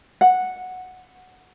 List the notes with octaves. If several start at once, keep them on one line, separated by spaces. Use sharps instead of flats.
F#5